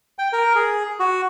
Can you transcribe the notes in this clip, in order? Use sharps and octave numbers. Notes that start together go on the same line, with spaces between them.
G5
A#4
G#4
F#4